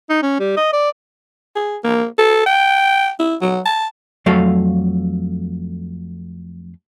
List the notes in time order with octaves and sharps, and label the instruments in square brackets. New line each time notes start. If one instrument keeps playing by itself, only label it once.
[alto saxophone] D#4
C#4
G3
D#5
D5
G#4
A#3
A4
G5
E4
F#3
A5
[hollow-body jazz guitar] F2 F#3 A3 A4 F5